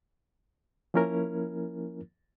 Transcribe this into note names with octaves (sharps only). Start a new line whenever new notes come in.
F3 A#3 C#4 E4 A#4